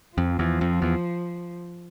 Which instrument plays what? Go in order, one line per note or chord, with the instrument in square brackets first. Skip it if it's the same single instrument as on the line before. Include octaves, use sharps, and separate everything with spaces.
[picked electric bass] F2 [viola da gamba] F3
[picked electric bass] E2
F2
E2